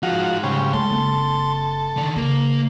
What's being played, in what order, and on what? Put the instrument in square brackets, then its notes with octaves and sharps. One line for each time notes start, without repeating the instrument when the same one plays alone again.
[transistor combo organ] F3 F#4 [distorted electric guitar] G#3 D#4
[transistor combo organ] G#2 C#3 G3
[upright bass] G#3 [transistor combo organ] A4 [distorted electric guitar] C6
[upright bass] F#1 C4
[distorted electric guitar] D3 D#3
[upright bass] C#3 [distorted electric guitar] A#3